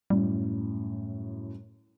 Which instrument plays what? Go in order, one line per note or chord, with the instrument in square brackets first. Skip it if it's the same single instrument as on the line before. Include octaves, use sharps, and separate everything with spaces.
[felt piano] F#2 A2 [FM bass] G3